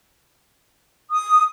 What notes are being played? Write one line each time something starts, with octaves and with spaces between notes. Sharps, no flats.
D#6